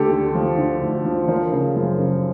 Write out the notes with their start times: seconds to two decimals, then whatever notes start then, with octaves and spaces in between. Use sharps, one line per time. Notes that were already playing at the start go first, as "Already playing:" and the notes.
Already playing: D2 G4 A4
0.11 D3
0.35 F3
0.57 D3
0.82 D2
1.05 F3
1.28 F3 A#4 C5
1.52 C#3
1.76 F#2
1.99 C#3